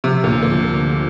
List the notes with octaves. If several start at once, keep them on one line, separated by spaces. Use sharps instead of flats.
C3 F3
D2 A#2
A#2 D3